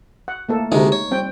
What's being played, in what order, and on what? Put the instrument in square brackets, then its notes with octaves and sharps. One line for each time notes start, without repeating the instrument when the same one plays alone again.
[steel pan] F#5
A3 A#3 A4
[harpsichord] D2 C3 G#3 [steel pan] D#4
[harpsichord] C#5
[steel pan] G3 C4 G5